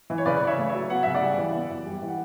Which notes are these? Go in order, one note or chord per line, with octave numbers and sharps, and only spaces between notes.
E3
C#5
C#3 B4 D5
C#3
C#5 E5
A3
C#5 E5
F#3
B3 F#5
C#3 E5
D5 F#5
G3
E3
B3
F#2
G3
E3
F#5